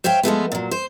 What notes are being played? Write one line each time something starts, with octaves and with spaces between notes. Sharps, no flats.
C5 C#5 E5 F5 G5
F3 G#3 A3 B3
A#2 F#3
C5